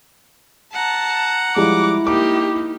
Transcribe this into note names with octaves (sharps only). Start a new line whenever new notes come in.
F#5 A5 A#5
F3 G3 G#3 E4 D6
A#3 D#4 G4 D6